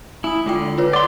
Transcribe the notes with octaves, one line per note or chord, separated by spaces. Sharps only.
E4 G#5 D#6
D3 G#3 F4 G5
F4 B4 C#5
D5 F#5 C6